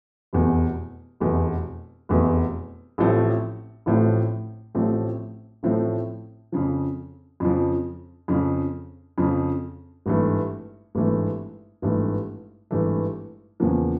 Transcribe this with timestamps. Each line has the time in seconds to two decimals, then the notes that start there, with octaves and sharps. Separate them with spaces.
0.33 F1 E2 B2
1.20 F1 E2 B2
2.09 F1 E2 B2
2.98 A1 A2 F3 A3 C4
3.86 A1 A2 F3 A3 C4
4.75 A1 A2 F3 A3 C4
5.63 A1 A2 F3 A3 C4
6.52 F2 C#3 F3
7.40 F2 C#3 F3
8.28 F2 C#3 F3
9.18 F2 C#3 F3
10.06 G#1 G2 E3 A3
10.95 G#1 G2 E3 A3
11.82 G#1 G2 E3 A3
12.71 G#1 G2 E3 A3
13.60 E2 C#3 F3 A#3